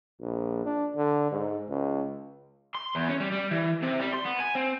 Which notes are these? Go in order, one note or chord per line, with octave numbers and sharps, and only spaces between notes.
A#1
D4
D3
G#2
C#2
C6
E2
C#4
G3
G3
E3
C3
G3
C6
B3
G#5
C4